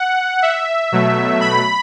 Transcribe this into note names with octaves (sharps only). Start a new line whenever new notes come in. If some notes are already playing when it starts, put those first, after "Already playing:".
Already playing: F#5
E5
B2 F#3 A3
B5